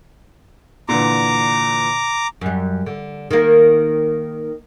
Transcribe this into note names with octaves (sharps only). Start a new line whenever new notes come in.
A#2 D3 E3 A#5 D6
F#2 G3
D3
D#3 A#3